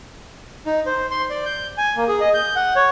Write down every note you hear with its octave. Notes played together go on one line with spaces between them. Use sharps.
D#4
C5
C6
D5
G6
G#5
A#3
G#4
D#5
G6
F#5
C#5